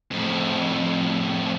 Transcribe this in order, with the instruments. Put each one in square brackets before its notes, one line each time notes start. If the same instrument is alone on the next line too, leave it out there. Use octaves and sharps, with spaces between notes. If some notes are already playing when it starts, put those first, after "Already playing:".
[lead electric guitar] F2 A2